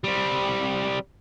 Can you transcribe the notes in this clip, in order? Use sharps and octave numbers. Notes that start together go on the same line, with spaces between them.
G3 C4